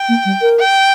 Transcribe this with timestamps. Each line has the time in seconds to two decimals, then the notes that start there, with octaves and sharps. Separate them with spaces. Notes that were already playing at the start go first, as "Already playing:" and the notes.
Already playing: G5
0.09 A#3
0.25 G3
0.42 A#4
0.59 G5